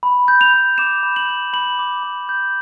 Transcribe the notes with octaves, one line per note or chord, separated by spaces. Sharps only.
B5
G6
F7
B5
D6 E7
B5
F#7
G6
B5 F#7
D6
B5
G6